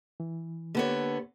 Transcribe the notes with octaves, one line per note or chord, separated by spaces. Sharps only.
E3
D3 A#3 B3 G4 C#5